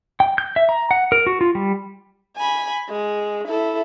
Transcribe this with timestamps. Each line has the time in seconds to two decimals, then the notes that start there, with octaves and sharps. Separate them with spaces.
0.20 G5
0.38 G6
0.56 E5
0.69 A#5
0.91 F#5
1.12 A#4
1.27 F#4
1.41 F4
1.55 G3
2.37 G#5 B5
2.90 G#3
3.48 E4 A4